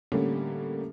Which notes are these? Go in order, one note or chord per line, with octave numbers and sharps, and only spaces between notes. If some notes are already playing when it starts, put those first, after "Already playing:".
A2 D3 G3 A#3 C#4